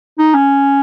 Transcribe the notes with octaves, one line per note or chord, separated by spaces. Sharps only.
D#4
C#4